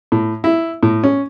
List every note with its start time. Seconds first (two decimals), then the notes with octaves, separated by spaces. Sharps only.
0.12 A2
0.44 E4
0.83 A2
1.04 C#4